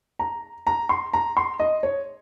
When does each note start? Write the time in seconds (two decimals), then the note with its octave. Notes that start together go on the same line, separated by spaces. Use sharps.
0.19 A#5
0.67 A#5
0.89 C6
1.13 A#5
1.37 C6
1.60 D#5
1.83 C#5